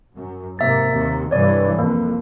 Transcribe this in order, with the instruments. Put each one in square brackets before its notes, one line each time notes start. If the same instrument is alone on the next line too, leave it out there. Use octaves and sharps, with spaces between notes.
[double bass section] F#2
[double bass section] G#2 C3 A#3 [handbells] E5 A6
[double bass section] D#2 C3
[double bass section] C2 G2 E3 [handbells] C#5 D5
[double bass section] F2 [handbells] A#3